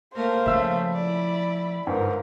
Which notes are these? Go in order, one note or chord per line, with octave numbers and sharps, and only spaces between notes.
A3 A#3 A#4 C5 F5
C#3 F3 A3 E5 E6
E4 D5 B5
G1 G#2 F4 A#4